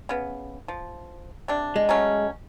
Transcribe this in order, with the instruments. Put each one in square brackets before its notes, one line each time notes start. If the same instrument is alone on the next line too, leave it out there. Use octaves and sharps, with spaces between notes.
[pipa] C#3 B3
F3
C3 D4
[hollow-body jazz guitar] G#3
[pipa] F#3 A3 C#4